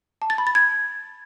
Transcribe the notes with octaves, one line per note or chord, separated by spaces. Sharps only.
A5
A6
B5
A6
G#6